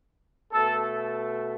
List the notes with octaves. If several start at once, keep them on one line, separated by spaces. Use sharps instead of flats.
B2 A3 A4